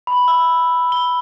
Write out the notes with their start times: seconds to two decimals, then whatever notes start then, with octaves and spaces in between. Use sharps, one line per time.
0.07 B5
0.28 E6
0.92 G7